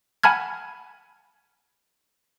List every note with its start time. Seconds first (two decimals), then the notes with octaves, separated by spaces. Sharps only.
0.23 F#5 G#5 A5 B5 F6 G#6